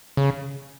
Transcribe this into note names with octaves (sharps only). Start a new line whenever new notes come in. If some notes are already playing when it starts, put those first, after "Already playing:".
C#3